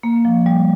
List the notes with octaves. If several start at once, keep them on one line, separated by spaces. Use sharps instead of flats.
A#3
F3
G3